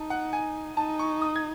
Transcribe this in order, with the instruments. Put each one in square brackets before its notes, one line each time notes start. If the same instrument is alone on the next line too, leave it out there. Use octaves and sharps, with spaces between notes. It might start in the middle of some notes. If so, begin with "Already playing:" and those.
Already playing: [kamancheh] D#4 [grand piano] A5
[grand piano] F#5
G#5
[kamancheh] D#4 [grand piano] A5
[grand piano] C#6
D#6
G#6